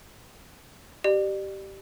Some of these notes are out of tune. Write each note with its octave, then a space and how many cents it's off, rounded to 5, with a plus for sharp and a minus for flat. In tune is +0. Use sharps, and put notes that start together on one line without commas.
G4 -15 D5 +35